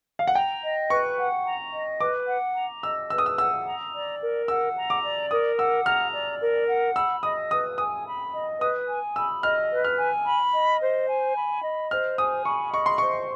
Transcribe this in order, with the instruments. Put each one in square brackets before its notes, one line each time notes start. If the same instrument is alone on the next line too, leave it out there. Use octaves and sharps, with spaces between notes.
[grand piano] F5
F#5
[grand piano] G5 [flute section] A#5
[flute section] D#5
[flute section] B4 [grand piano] C#6
[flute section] F#5
A#5
D#5
[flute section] B4 [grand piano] D6
[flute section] F#5
A#5
[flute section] D#5 [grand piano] E6
[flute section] B4 [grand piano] E6
[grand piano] D#6
E6
[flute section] F#5 [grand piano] E6
[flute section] A#5
D5
A#4
[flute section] F#5 [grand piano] E6
[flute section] A#5
[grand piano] D6
[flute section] D5
[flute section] A#4 [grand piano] D#6
[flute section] F#5 [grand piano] E6
[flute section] A#5 [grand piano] F6
[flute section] D5
A#4
F#5
[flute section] B5 [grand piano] E6
[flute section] D#5 [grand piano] D#6
[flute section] B4 [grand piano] D#6
[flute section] G#5 [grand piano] D#6
[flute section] B5
D#5
[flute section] B4 [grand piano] D#6
[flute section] G#5
[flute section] B5 [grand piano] E6
[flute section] D#5 [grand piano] F6
[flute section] B4
[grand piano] F6
[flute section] G#5
B5
D#5
C5
G#5
B5
D#5
[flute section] C5 [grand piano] F6
[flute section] G#5 [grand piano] D#6
[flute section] B5 [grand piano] C#6
[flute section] D#5 [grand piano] C#6
[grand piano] C6
[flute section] C5 [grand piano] C#6